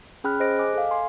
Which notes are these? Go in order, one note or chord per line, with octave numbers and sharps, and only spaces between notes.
C#4 G#4 G5 B5 F6 F#6
G#4 C5 D#5 F#6 A#6 D7
D#5 G#5 D6
A4 F5
G#5 C6